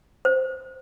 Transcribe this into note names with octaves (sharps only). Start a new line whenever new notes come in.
C5